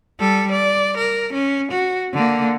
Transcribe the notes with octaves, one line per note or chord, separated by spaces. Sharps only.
G3 A4
D5
A#4
C#4
F#4
D3 A#3